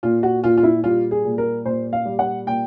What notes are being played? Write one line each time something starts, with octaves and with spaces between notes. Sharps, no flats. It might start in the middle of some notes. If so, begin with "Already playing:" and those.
A#2 F4
F#4
A#2 F4
F4
E4
G3 F4
G#4
A#2
A#4
A#2 C5
F5
G3
F#5
A#2 G5